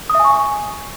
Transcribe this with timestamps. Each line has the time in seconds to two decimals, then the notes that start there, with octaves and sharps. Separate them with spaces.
0.10 D#6
0.15 E5
0.20 G#5
0.25 C#6